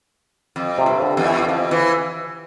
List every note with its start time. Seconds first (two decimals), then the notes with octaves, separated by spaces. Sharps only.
0.56 F2
0.78 C3
0.86 G2
1.02 D3
1.17 E2
1.25 E3
1.48 F2 F3
1.71 E3